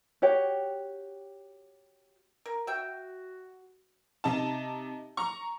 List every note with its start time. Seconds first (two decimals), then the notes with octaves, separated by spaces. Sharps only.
0.22 F#4 G4 C#5 G5
2.46 A#4
2.67 F#4 E5 G5
4.24 C3 D#4 A5
5.17 A#5 C#6